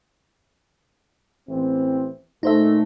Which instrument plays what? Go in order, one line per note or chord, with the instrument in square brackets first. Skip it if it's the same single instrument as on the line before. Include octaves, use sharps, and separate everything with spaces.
[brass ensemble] A1 E3 C4
[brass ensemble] A#2 A3 [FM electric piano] D#4 C5 E5